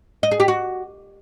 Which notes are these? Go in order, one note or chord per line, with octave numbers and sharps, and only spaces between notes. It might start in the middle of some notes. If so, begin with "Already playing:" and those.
D#5
G#4
G4
F#4